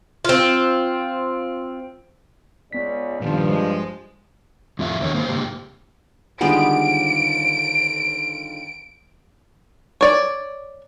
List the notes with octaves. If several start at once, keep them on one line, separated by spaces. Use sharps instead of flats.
C4 F4
C#2 C#3 B3 D5 B6
G2 A#2 D#3 F3
G#3 C5 D#5
F2 A2 F3 E5
E2 D3 D#3 F#3 A#4 C#5
G#2 A#3 C5
G#2 C#3 A#3 G4
D3 D#3 G3 G#3 B3 F4 D7
C#5 D5